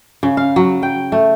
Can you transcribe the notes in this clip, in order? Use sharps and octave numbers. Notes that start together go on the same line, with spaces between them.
C#3
F5
F#3
G5
A3